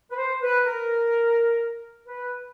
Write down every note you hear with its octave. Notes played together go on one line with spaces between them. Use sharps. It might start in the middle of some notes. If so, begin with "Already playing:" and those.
B4
C5
B4
A#4
B4